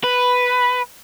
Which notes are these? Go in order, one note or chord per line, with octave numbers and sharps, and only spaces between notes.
B4